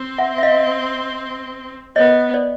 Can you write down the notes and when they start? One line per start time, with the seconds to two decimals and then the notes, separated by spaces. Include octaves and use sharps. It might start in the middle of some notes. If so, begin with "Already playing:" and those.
Already playing: C4
0.18 E5 F#5
0.38 E5
0.43 D#5 F5
1.96 B3 C#5 D#5
2.34 C5 D5